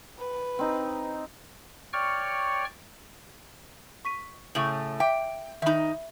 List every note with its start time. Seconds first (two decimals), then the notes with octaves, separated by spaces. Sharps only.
0.19 B4
0.59 C4 D#4
1.93 C#5 D5 G5 C#6 F6
4.05 C#6 B6 D#7
4.55 A2 C#3 A3 C#6 F#7
5.00 E5 G5 D6
5.62 D#3 D#4 E5 B5